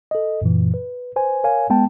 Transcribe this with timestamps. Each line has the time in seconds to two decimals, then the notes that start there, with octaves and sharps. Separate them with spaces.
0.11 A4 D#5
0.42 F#2 A#2 E3
0.74 B4
1.16 B4 C5 G#5
1.44 A#4 C#5 F5 G#5
1.70 G#3 B3 G5 A5